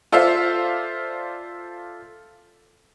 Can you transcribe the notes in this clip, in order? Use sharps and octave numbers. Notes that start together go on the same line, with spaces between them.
F4 A4 C5 D5 E5 F5